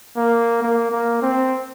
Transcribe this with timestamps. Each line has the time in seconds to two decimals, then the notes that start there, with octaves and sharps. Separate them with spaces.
0.16 A#3
0.62 A#3
0.91 A#3
1.22 C4